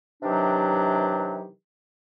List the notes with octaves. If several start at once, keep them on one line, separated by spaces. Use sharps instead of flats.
C3 D#3 E3 F#3 D4 G4